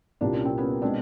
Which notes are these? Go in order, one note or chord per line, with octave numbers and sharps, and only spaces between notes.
C2 A#2 G3 A#3 D4
C#4
C4
B3 C#4
B2 G#3 C4 D4